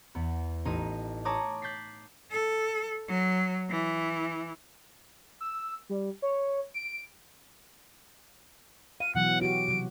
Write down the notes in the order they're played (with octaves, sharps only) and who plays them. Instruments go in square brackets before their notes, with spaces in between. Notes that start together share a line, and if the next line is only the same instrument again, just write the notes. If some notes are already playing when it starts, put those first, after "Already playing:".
[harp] E2 B3
A1 D#4 D#7
C#5 A5 A#5 D6 D#6 F#6
F#6 G6 A6 B6 C7
[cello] A4
F#3
E3
[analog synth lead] E6
G3
C#5
D7
[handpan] F5 [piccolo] D#7
[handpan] B2 E3 F#3 [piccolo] F#5
[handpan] F#4 G4 [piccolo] D7
[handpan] C3 F#3